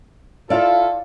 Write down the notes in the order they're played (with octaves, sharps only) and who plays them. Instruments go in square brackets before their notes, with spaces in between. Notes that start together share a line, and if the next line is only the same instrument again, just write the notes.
[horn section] E4 F4 A4 [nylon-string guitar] D5 F5